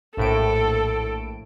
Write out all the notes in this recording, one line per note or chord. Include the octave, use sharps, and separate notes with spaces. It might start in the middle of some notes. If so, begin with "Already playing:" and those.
A#1 A2 A4 D7